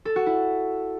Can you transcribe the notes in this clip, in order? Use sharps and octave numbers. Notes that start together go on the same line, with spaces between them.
A4
F#4
E4